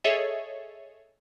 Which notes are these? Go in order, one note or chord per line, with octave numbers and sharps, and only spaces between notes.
G#4 A4 C#5 D#5 E5